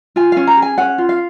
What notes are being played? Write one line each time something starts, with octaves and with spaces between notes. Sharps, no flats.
F4 G#5
C#4 F5
A#5
G#4
G#5
C#4 F#5
F4
F5